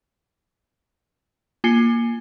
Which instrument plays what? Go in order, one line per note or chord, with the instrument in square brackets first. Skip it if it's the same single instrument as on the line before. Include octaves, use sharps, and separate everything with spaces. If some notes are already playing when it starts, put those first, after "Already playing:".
[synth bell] A#3 F4 G#5 C7 C#7 G7